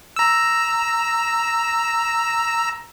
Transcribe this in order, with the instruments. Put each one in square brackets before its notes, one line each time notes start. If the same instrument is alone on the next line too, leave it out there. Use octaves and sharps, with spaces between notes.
[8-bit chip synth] A#5 E6